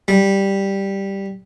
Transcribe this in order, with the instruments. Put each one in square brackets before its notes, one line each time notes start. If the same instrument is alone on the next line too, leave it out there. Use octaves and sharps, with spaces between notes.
[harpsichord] G3